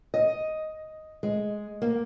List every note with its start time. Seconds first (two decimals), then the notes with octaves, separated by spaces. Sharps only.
0.14 D#5
1.23 G#3
1.82 A#3